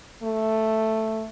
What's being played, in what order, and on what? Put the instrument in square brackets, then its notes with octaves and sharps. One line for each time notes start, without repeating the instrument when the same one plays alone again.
[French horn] A3